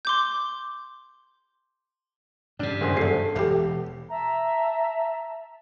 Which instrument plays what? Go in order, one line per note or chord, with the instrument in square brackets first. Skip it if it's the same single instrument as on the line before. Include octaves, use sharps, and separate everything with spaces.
[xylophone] C6 D6 G6
[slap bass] G2 C3 [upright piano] D4
[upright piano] F#1 G#4 C5
[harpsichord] D2 D3 [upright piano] A4 C7
[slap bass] E1 [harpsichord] A3 E4 G4
[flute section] E5 A5 A#5